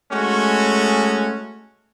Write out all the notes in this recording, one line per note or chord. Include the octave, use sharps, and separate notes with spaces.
G#3 A3 C#4 F#4